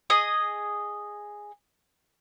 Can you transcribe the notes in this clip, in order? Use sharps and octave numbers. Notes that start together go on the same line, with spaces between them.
G#4 D#5 D#6